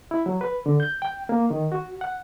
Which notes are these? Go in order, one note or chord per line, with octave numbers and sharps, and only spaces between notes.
E4
F#3
B4
D3
G6
G5
A#3
D#3
F#4
F#5